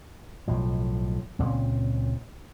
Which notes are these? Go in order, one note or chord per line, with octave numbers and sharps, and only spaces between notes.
B1 A2 F3
C#2 A#2 C4 C#4